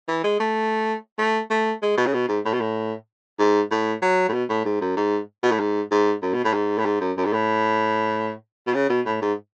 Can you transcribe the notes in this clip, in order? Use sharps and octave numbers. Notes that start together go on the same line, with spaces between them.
E3
G#3
A3
A3
A3
G#3
B2
C#3
B2
G#2
A2
B2
A2
G#2
A2
F#3
A2
B2
A2
G#2
F#2
G#2
B2
A2
G#2
G#2
F#2
B2
A2
G#2
A2
G#2
F#2
F#2
G#2
A2
B2
C#3
B2
A2
G#2